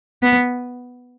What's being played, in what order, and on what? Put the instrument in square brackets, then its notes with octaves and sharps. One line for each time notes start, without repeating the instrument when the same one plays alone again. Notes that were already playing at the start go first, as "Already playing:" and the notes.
[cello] B3